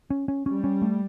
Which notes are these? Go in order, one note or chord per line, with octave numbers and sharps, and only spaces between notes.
C#4
C#4
G3 C#4
C#4
A3